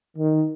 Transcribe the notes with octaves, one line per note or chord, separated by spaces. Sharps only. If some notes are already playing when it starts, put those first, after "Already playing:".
D#3